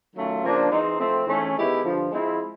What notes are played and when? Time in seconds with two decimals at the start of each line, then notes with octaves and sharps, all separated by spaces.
0.15 D#3 F#3 A3 C#4 F4
0.43 C#3 F3 A#3 D4
0.71 E3 G#3 C4 D#4
0.99 F3 A3 C4
1.27 G#2 E3 A3 C#4
1.55 D#3 G#3 B3 E4 G4
1.83 G2 D3 F3
2.12 F3 G#3 C4 E4